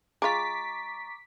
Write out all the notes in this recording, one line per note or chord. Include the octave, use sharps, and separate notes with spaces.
G#3 F4 A#5 C#6 D6 A6 B6